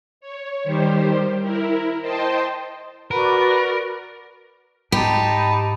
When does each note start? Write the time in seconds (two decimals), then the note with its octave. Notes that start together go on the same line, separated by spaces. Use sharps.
0.21 C#5
0.64 D#3 G3 G4 C5
1.41 E4 A#4
2.02 C5 D#5 G5 A5 C6
3.11 F#4 A#4 B4 D5
4.92 G#2 D#4 G4 A5 B5